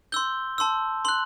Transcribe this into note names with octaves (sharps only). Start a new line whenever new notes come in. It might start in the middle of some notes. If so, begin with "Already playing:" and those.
C6 E6 G6 G7
A5 C6 E6
C6 F#6 F#7